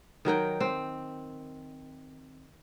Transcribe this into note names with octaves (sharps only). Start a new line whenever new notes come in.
D#3 F#3 A#4 G5
C4